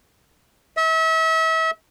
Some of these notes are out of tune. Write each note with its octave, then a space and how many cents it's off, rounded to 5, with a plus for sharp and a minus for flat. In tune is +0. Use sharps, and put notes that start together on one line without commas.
E5 -35